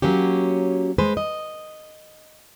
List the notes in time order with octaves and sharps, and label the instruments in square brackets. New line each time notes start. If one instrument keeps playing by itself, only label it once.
[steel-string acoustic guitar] F#3 A#3 C#4 G4
G#3 B4 C5
D#5